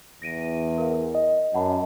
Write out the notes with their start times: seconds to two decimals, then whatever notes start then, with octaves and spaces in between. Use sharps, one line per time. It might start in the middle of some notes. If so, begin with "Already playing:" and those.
0.22 E2 A#6 D7 D#7
0.78 A#4 F5
1.15 D#5
1.54 F#2 F#5 A5 B5